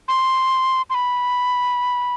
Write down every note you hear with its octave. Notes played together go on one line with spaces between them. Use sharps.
C6
C6
B5